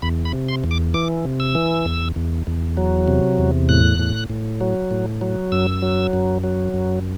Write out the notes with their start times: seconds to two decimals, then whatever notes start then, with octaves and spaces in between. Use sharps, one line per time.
0.02 E2 B5
0.25 B5
0.33 C3
0.49 C6
0.64 E2
0.71 D6
0.94 E3 D6
1.25 C3
1.40 E6
1.55 E3
1.86 E2
2.16 E2
2.47 E2
2.77 F#3
3.08 C3
3.38 E2
3.69 A2 F#6
3.99 A2
4.30 A2
4.61 F#3
4.91 A2
5.21 F#3
5.52 F#2 E6
5.82 F#3
6.13 F#2
6.44 F#3
6.74 F#2